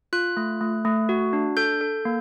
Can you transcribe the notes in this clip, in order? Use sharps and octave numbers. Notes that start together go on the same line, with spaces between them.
F4 F#6
A3
A3
A3
F#4
D4
A4 G6
A4
A#3